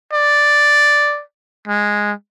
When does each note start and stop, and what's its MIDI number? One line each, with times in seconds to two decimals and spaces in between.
0.13 1.22 74
1.68 2.12 56